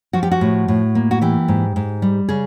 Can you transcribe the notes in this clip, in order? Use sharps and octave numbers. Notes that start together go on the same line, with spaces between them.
F3 F#4
G4
F#4
A2
A2
A#3
F#4
E3 G4
G#2
G#2
G3
C#3 G#4